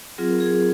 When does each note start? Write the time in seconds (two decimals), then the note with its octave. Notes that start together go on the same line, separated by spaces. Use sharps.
0.18 F#3 C4 F4 G#4
0.29 A#4
0.40 G#4
0.51 G#4